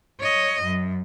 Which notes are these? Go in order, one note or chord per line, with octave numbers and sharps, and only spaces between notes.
C#5 D#5
F#2